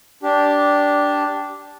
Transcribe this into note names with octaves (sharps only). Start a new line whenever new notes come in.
D4 G4